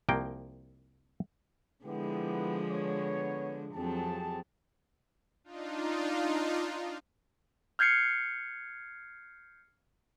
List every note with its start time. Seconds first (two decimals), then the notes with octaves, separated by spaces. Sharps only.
0.09 C2 F3 A#3 G5
1.85 D3 F3 G#3 B3 E4 G4
2.70 B3 C#5
3.74 F2 F#3 C4 G4 G#4 A5
5.44 D4 D#4 F4
7.79 F6 G6 G#6 C7 C#7